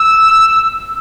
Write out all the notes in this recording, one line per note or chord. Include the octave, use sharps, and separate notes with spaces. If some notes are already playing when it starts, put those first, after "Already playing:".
Already playing: E6